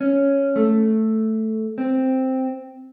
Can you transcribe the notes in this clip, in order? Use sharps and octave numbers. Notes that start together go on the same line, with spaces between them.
C#4
A3
C4